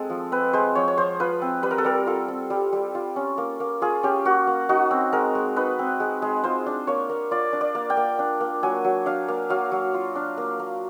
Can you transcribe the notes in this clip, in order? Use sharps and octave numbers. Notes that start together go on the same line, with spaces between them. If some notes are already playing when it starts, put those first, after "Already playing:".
Already playing: G#3 C4 A4
F3
C4 B4
G#3 C5
F3 C#5
C#5
F3 C5
F4 B4
C4
G3 B4
A#4
A4
G3 A#4
F4 A4
C4
G3
G3
F4
C#4
A#3
A#3
F4 G#4
C#4 G4
A#3 F#4
A#3
D#4 F#4
C4
G#3 A#4
G#3
D#4 B4
C4
G#3
G#3
F4 C5
D4
A#3 C#5
A#3
F4 D5
D4
D5
A#3
G5
A#3
D4
A#3
F#3 G#5
F#3
D4 F5
A#3
F#3 F5
F#3
F4
D4
A#3
A#3